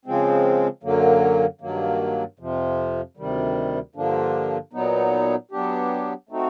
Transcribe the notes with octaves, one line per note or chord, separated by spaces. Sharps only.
C#3 F3 G#3 C4
F#2 D3 F#3 A#3
G2 D#3 F#3 A#3
F2 C3 F3
D2 C3 D#3 G3
G2 D3 F3 A#3 D4
A#2 F#3 B3 D#4
F#3 B3 D4 G4
A3 C4 D#4 F#4